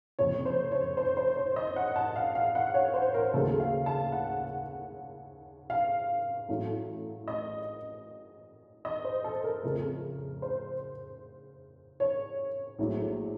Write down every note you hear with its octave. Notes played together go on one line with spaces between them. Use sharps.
F#1 F2 C3 C#5
C5
C#5
C5
C5
C#5
D#5
F#5
A5
F5
F5
F#5
C#5
C5
A#4
D#2 C#3 F#3 A3 A4
F5
A5
F#5
F5
A1 A2 F#3 A3
D#5
D#5
C5
A4
A#4
F2 C#3 F3 A3
C5
C#5
A#1 A2 F#3 A3